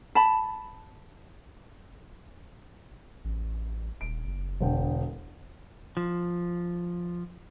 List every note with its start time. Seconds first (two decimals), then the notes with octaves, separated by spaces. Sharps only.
0.15 A5 B5
3.24 A1
4.01 D#1 D7
4.26 F#1
4.61 E1 D3 G5
5.97 F3